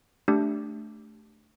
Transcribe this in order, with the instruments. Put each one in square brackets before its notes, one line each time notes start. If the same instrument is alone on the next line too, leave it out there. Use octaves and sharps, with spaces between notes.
[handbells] A3 D4 G4